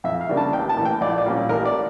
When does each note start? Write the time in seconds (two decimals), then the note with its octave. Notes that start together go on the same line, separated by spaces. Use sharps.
0.04 F2 E5
0.21 F5
0.29 C#3 G3 A#3 D4
0.37 A5
0.53 A1 G5
0.69 A5
0.77 A2 E3 A#3
0.85 G5
1.01 A#1 D5
1.18 D5
1.26 A#2 G3 C#4
1.49 A1 A#4
1.65 D5